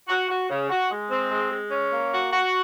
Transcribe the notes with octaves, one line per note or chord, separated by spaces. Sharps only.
F#4
F#4
C#3
F#4
G#3
C4
G#3
G#3
C#4
A#3
F#4
F#4